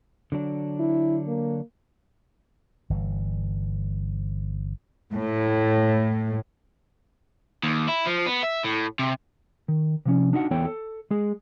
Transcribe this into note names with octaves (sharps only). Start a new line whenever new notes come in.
D3 F#3 D4
E4
A#3
G1 E3
A2
D#2
E4
F3
B3
E5
A2
C3
D#3
C3 F3 C#4
D4 D#4 F#4 E5 F#5
E2 E3 B3 A4 C#5 G5
A4
G#3 G#4